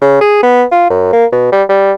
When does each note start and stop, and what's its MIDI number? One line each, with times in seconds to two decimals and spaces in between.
0.02 0.17 49
0.21 0.43 68
0.43 0.64 59
0.72 0.87 65
0.90 1.10 42
1.13 1.25 58
1.32 1.50 47
1.52 1.63 55
1.69 1.92 55